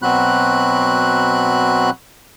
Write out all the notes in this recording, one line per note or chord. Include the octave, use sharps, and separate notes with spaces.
B2 F#3 C4 F#4 B5 F#6